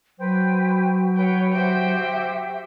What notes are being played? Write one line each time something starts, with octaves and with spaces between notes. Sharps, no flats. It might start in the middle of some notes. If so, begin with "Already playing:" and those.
F#3 B4 C5 G5
B4 C#5 F#5 G5
F#4 G4 C5 E5 G5